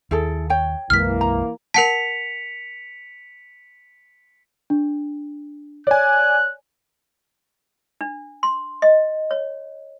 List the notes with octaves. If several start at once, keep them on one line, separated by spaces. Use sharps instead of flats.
D#2 E4 G#4 A4
C#5 G5
B1 F#2 E3 G#3 A#3 F6 B6
A#5
A#4 F#5 A5 B6 C#7 F7
D4
C#5 D5 G#5 F#6
D4
C6
D#5
C#5